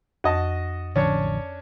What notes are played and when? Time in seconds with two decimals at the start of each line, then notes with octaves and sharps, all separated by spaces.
0.24 F2 F#4 D#5 A5
0.96 A1 D3 F3 C#4 D4 C#5